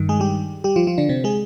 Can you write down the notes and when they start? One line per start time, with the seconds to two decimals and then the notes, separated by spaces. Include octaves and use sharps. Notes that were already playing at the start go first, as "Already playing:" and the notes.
Already playing: G2 D#3
0.09 G#3 G#4
0.20 G3 G4
0.64 G3 G4
0.76 F3 F4
0.87 F3 F4
0.98 D3 D4
1.09 C3 C4
1.24 G#3 G#4